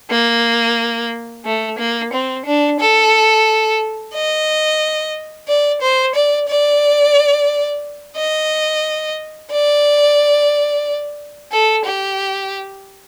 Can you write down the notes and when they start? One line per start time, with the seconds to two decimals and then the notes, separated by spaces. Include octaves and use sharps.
0.11 A#3
1.45 A3
1.78 A#3
2.13 C4
2.45 D4
2.80 A4
4.14 D#5
5.48 D5
5.81 C5
6.15 D5
6.48 D5
8.17 D#5
9.51 D5
11.52 A4
11.85 G4